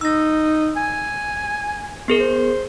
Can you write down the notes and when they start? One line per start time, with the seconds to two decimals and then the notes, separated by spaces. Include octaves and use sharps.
0.01 D#4 E6 A#6
0.76 G#5
2.08 B3 G#4 A#4
2.20 C5